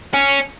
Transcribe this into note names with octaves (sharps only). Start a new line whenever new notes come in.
C#4